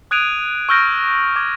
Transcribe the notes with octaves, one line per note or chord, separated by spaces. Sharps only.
D#6 F#6 G#6 D7 D#7 F7
C#6 E6 F6 G6 A#6 D7
D6 G#6